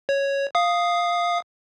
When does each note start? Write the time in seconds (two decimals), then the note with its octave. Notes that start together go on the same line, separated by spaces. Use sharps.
0.09 C#5
0.55 F5 D#6